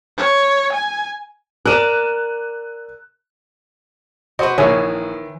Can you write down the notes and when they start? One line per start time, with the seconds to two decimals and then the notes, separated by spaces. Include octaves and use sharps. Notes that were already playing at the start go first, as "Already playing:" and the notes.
0.18 C#5
0.73 G#5
1.65 A#4 D5 F#6 D#7 E7
4.39 F#4 B4 C5 D#5 C6
4.58 A#1 D#3 E3 G#4 C#5 E5 G#5